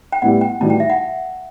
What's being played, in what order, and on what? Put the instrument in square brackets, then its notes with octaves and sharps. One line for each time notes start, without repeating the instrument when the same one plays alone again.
[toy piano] G5
[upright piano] A2 G3 B3 E4 G4 [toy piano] F#5
[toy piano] G5
[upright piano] A2 E3 G3 D#4 F#4 [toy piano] A5
[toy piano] G5
E5
F#5